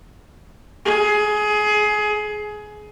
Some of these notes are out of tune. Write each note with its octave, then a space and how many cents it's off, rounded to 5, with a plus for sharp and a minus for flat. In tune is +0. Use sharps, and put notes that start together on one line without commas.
G#4 +20